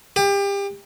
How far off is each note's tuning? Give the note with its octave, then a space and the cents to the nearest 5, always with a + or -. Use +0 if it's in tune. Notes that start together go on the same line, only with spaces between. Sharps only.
G4 +30